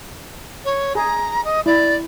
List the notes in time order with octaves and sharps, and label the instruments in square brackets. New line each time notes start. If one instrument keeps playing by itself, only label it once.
[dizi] C#5
[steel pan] G#4 [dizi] A#5
[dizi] D#5
[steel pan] E4 [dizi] D5